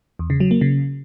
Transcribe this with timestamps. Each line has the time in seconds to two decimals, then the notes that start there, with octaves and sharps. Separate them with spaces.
0.19 E2
0.30 C#3
0.40 F#3
0.51 A#3
0.61 C#3